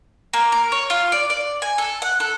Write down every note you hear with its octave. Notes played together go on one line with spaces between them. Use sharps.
A#3
A#4
C#5
F4
D5
D5
G#5
A4
F#5
A4